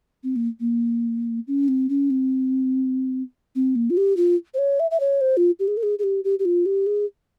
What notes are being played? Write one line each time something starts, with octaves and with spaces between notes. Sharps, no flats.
C4
A#3
A#3
C#4
C4
C#4
C4
C4
A#3
F4
G4
F4
C5
C#5
E5
E5
C#5
C5
F4
G4
G#4
A#4
G#4
G#4
G4
G4
G4
F4
G4
G#4